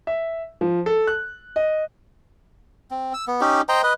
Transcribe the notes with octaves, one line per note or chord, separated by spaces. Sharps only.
E5
F3
A4
F#6
D#5
C4
E6
B3
C#4 D#4 G4
C5 D#5 G5 A#5
B4 D#5